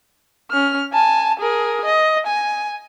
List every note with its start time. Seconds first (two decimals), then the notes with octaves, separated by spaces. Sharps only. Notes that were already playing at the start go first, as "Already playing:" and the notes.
0.51 C#4 F6
0.93 G#5 A5
1.40 G#4 A#4
1.85 D#5
2.27 G#5